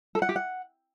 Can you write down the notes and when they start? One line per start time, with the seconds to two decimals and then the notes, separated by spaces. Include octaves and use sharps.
0.15 A4
0.22 F#5
0.29 G4
0.36 F#5